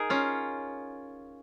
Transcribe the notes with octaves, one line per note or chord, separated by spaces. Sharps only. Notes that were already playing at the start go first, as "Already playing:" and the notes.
Already playing: D#4 G#4 A#4
C#4 F4